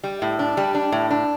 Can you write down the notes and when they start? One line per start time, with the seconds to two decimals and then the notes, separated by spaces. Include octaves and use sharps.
0.04 G3
0.22 A2
0.39 D4
0.57 G3
0.75 D4
0.92 A2
1.11 D4